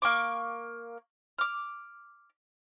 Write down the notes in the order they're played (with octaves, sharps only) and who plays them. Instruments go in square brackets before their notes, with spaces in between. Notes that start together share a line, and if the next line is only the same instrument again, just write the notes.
[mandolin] A#3 C#6 D6
D6 F6